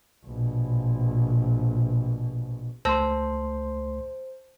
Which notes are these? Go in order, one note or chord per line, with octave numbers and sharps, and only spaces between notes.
A#1 B2
C#2 A3 C5 A5 C6 E6 A#6